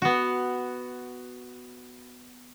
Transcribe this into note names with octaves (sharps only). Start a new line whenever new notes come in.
B3 F#4